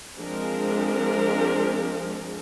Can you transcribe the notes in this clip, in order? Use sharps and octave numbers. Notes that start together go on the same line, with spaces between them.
F3 G#3 C4 D4 G#4 A#4